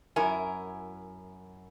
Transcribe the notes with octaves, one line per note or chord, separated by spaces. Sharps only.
F#2 E4 A#4 G#5